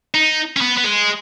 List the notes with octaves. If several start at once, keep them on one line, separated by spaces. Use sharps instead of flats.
D#4
C#4
B3
B3
G#3